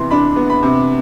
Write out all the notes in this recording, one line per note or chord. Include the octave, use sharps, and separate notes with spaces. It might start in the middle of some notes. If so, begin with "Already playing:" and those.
Already playing: C3 E3 B3 C6
D4 B5
B3
B5
C3